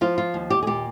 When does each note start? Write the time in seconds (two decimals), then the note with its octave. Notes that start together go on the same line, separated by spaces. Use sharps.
0.01 F3 F4
0.18 F4
0.34 D#2
0.50 G4
0.63 G#4
0.67 A#2 G4